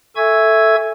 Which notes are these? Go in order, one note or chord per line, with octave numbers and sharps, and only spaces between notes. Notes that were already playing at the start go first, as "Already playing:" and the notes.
A4 E5 G#5 C#6 E6 G#6